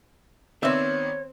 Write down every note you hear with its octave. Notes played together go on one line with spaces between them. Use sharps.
D#3 B3 C4 C#5 D5 E5